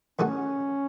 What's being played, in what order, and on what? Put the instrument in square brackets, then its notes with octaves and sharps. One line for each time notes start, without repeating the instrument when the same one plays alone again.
[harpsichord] E2 D#3 A3 D#4 F#4 [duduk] C#4